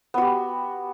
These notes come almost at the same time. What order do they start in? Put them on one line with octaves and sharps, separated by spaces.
B3 F#4 G4